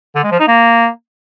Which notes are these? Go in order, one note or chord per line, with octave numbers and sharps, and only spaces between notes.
D3
G#3
F3
D#4
A#3